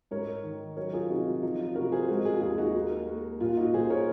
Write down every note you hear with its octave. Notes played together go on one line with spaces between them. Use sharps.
G#2 A#4 C#5
D#3
F#3 A#4 C#5
F4 G#4
C3 D#4 F#4
F4
F3 D#4
F4
C3 F#4 A#4
G#4 C5
G#3 F#4 A#4
F4 G#4
D#2 F4 G#4
D#4 F#4
A#3
A#3
A#2 F4
D#4 F#4
A#2 G#4 C5
A#4 C#5